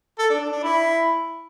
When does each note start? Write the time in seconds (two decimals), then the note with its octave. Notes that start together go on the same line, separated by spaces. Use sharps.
0.19 A4
0.30 D4
0.41 D4
0.52 D4
0.63 E4